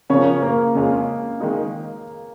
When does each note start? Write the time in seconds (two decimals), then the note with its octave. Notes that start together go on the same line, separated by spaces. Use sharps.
0.10 C#3 F3 C#4 A#4 C#5
0.42 A#3
0.75 F2 C#3 G#3 C#4 F4
1.40 D#3 G#3 D#4